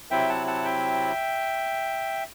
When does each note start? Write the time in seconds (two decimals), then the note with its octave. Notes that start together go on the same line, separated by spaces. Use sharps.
0.11 C3 F#3 C4 E4 E5 G5
0.29 F#5 A5
0.47 F#5 A5
0.65 E5 G5